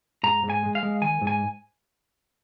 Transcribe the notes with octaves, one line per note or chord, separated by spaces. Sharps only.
G#2 A#5
G#2
G#5
G#3
F5
G#3
D#3 G#5
G#2
G#5